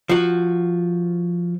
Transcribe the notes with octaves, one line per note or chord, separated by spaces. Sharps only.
F3 F#4